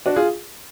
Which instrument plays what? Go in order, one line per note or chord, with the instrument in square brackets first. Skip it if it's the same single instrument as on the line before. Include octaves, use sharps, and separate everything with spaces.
[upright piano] D4 F#4
F4 G#4